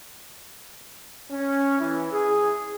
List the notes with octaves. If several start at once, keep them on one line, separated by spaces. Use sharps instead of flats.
C#4
E3
G#4